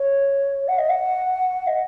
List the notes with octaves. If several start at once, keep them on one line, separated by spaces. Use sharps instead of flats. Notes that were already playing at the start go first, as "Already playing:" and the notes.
Already playing: C#5
F#5
D#5
F#5
D#5